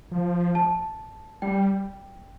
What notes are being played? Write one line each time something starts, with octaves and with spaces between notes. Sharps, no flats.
F3
A5
G3 G5